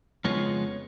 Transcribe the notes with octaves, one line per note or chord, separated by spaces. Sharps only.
F2 C#3 G#3 B3 F4 C#5